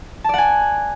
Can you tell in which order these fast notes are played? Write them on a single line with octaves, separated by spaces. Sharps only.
A5 D5 F#5 G#5